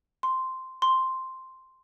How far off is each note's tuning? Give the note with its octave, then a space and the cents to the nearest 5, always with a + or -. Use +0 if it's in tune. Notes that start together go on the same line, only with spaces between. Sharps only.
C6 -5
C6 +0